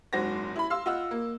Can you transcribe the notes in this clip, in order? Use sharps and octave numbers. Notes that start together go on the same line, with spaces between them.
F#1 G#2 F#4 C5 A#6
E4 B5
F5 C6 E6
F4 D#5 F#5 E6
A#3